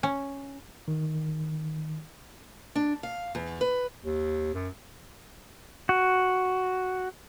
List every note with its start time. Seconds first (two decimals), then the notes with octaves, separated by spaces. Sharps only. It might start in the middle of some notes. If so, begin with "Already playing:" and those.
0.03 C#4
0.88 D#3
2.75 D4
3.03 F5
3.35 E2
3.61 B4
4.05 D#2
4.54 F#2
5.89 F#4